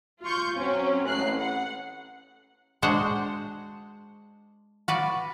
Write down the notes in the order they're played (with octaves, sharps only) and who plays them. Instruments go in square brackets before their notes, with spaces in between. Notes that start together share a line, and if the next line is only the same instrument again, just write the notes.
[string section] F4 C6 C#6 G6
F#3 C4 C#4
A1 A3 F#6 C7
F#5
[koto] G#3 D4 F#4 C5 F#5
F#4 B4 D5